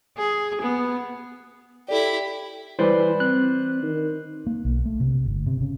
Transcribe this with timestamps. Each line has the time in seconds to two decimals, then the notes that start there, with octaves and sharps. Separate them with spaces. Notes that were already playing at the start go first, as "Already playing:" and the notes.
0.18 G#4
0.62 B3
1.89 E4 G4 A4 D5
2.79 E3 G3 E4 B4 C5 D5
3.20 C4 F#6
3.83 D#3
4.47 A#3
4.65 B1
4.86 A3
5.00 C3
5.26 G1
5.46 C3
5.61 C#3